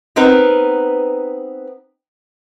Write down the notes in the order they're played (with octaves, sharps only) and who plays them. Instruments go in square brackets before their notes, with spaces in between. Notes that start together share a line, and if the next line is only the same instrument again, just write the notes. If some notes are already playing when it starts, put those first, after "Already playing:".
[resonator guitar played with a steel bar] B3 C4 D#4 A#4 B4